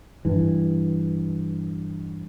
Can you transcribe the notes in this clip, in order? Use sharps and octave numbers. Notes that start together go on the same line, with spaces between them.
G2 E3